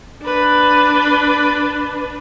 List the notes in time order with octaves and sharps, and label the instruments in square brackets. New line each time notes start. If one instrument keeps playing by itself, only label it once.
[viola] D4 B4